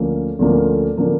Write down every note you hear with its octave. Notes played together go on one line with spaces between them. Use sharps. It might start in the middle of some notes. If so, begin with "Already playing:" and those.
Already playing: D2 D3 F3 A#3 C#4
D2 D3 F3 A#3 C#4
D3 F3 A#3 C#4